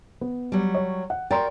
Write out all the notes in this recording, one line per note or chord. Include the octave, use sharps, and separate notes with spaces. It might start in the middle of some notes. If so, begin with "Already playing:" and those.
B3
F#3 G3
C#5
F#5
F#4 A#4 D5 G5 A#5 C6